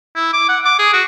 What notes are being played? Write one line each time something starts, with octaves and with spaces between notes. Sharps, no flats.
E4
D6
F#5
D6
G#4
F#4